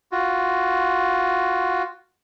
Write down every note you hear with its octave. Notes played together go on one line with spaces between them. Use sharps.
F4 F#4